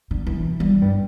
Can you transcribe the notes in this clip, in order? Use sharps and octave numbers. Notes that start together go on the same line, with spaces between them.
D3
E3
G3
G2